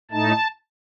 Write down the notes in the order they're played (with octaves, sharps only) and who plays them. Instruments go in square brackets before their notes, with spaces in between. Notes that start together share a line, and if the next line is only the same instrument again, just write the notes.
[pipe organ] A2 A3 D#4 A5